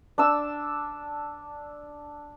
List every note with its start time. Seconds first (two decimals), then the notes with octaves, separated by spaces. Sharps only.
0.18 D4 E6